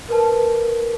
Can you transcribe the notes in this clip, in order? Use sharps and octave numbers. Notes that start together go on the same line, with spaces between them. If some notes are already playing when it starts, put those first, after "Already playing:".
A#4 B4 A5